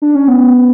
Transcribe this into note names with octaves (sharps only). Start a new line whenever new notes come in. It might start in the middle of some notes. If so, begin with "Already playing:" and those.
D4
C#4
B3